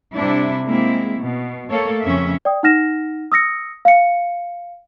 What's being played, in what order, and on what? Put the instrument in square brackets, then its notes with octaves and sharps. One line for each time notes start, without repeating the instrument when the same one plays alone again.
[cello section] C3 G3 D4 E4
G#3 A#3 C4 E4
B2
A3 A#3 A4 C#5
F2 C#3 C#4 E5
[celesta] D5 G5 D#6
D#4 F#5 F6 A#6 E7
D#6 E6 A#6 C#7
F5 C#7